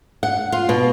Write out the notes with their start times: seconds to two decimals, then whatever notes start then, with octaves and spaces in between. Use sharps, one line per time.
0.23 F#5
0.52 F4
0.69 B2